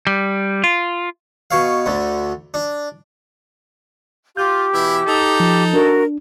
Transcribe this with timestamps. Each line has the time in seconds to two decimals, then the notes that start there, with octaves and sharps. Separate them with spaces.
0.07 G3
0.64 F4
1.51 B2 C#5 F5
1.86 D2 D3
2.54 D4
4.37 F4 G4 G6
4.73 B2 E3 E4
5.07 D#4 A4
5.40 F3
5.73 D4 F#4 A#4